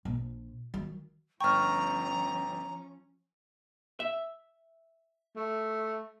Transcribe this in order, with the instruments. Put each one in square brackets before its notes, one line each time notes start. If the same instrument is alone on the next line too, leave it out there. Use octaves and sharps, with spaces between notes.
[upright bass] A#1
D#3 F#3
[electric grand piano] G1 G5 [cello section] F3 C#4 [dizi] A#5 [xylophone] C#6 F6
[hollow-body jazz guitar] E5
[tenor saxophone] A3